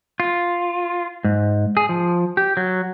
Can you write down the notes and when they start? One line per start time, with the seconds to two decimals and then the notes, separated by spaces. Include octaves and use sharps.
0.20 F4
1.24 G#2
1.77 G#4
1.89 F3
2.37 G4
2.57 F#3